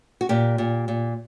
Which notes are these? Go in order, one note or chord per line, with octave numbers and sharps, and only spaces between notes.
F#4
A#2 G4
A#2
A#2